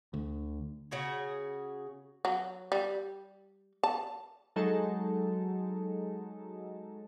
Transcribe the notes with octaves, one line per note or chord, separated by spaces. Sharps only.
D2
C#3 F#4 G#4
F#3
G3
A5
F#3 G#3 D#4 A4